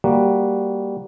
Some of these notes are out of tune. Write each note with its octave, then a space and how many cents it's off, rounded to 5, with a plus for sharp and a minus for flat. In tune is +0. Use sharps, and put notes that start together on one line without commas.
G3 +0 A#3 +0 F#4 +0